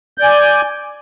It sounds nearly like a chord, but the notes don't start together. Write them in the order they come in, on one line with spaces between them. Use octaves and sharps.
G6 D5 G#5